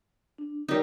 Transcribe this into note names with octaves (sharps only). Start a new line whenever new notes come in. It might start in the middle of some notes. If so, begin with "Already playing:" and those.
D4
G3 D#4 A#4 C#5